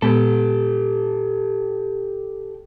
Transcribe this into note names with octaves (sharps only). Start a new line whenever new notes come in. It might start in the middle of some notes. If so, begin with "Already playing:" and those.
A#2 G#3 B3 G4 A4